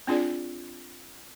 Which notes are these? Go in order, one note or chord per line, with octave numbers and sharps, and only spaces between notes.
C4 D4 F4 G#4 D5